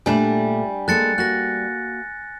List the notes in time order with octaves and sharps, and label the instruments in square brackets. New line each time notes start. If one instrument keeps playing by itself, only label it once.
[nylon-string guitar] A#2 A3 [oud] G3 D4 [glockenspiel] G#5
[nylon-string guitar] G#3 A#3 A4 [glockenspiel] F#6 A6 C#7
[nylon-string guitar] A#3 F#4 [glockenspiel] F#6 A#6